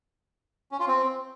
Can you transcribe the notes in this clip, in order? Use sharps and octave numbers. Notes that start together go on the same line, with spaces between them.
C#4
F4
C4